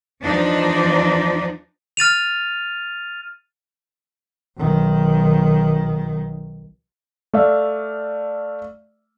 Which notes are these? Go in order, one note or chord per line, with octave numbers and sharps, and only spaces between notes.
E2 F3 D4 D#4
F6 A6 D#7 F7
B1 D#3
A3 D5 E5 F5